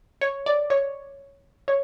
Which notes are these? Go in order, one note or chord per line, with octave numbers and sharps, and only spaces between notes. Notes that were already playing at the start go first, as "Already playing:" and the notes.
C#5
D5
C#5
C#5